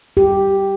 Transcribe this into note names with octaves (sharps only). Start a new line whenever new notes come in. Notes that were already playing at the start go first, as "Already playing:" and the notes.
G4